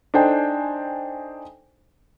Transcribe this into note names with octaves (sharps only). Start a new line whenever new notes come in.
D4 D#4 A4 C5 G5 G#5